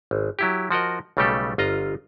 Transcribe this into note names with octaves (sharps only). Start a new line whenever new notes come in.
G#1
F#3 E4 G4
F3 F#4 A#4 D#5
B1 C#3 G3 A3 G4 A4
G1 F4 D#5 A#5